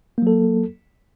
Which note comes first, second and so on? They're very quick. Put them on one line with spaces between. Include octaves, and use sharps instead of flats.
A#3 F#3 A4